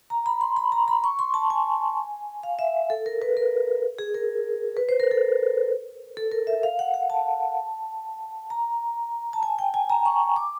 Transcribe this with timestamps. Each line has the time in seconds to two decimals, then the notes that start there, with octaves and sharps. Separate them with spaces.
0.10 A#5
0.26 B5
0.41 C6
0.56 B5
0.72 A#5
0.88 B5
1.04 C#6
1.19 C6
1.34 A5
1.50 G#5
2.43 F5
2.59 E5
2.90 A4
3.06 A#4
3.22 B4
3.37 A#4
3.99 G#4
4.14 A#4
4.77 B4
4.89 C5
5.00 A#4
5.11 A4
6.17 A4
6.32 A#4
6.47 E5
6.63 F5
6.79 F#5
6.94 F#5
7.10 A5
8.50 A#5
9.33 A5
9.43 G#5
9.59 G5
9.74 G#5
9.90 A#5
10.05 C#6
10.36 D6